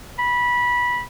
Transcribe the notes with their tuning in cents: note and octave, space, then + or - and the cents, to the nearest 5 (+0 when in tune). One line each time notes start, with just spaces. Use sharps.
B5 -15